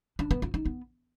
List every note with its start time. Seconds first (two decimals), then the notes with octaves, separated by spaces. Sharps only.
0.19 D4
0.31 B3
0.42 F4
0.54 D#4
0.66 B3